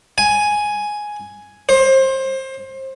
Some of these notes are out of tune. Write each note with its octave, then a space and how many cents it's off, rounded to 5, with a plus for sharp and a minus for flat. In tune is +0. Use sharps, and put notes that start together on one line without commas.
G#5 +5
C5 +25